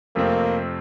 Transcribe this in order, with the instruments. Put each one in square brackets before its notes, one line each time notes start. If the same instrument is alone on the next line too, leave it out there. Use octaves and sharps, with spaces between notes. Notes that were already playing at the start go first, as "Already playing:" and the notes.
[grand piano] F2 C3 F3 A3 C4 [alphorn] A#3